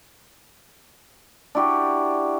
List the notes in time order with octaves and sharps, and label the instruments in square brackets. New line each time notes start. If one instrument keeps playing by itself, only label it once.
[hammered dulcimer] D4 E4 F#4 G4